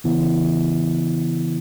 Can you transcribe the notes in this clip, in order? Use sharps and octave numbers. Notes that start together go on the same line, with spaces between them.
C#3 E3 B3 E4